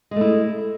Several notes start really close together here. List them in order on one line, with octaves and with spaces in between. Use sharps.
G#3 A3 E4